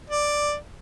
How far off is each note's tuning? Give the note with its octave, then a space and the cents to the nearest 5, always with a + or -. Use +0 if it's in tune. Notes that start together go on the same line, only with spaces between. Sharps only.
D5 +5